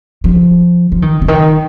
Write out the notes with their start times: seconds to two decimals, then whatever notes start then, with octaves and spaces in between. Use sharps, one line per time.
0.24 F3
0.92 F3
1.02 D#3
1.21 C#3
1.28 D#3